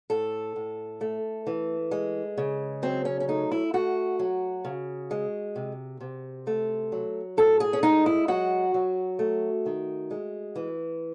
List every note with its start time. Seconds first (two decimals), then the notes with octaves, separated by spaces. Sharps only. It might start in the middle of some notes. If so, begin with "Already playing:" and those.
0.10 A2 A4
0.56 A2
1.01 A3
1.47 E3
1.91 G#3
2.38 C#3
2.82 F#3 C4
3.05 C#4
3.20 C#4
3.28 A3 D#4
3.52 E4
3.73 A3 F#4
4.19 F#3
4.65 C#3
5.11 G#3
5.56 C3
6.01 C3
6.47 A3
6.92 F#3
7.37 A2 A4
7.60 G#4
7.73 C#4
7.83 G#3 D#4
8.06 E4
8.28 F#3 F#4
8.74 F#3
9.19 A3
9.66 D#3
10.11 G#3
10.56 E3